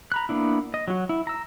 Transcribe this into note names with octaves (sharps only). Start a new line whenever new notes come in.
A#5 B5 F#6
A#3 B3 D4 E4
D#5
F#3 F#4
E4
A#5 E6